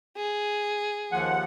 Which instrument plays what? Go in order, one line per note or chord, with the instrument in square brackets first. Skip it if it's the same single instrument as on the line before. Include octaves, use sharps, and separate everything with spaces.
[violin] G#4
[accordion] D#2 F3 F#5